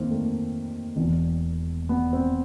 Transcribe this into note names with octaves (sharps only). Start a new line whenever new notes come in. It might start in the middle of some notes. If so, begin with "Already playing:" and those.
Already playing: D#2 D#3 A#3 C4
A3
E1 E2 B2
B3
C4